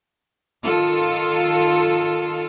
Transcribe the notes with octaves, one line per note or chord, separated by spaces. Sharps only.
D#3 F4 A4